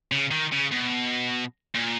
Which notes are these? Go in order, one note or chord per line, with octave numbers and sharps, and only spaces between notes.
C#3
D#3
C#3
B2
A#2